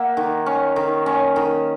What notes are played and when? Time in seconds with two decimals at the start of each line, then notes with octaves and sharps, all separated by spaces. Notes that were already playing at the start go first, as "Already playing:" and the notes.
Already playing: A#3 E5 F#5
0.17 D#3
0.46 C#4
0.76 D#3
1.06 C#4
1.36 D#3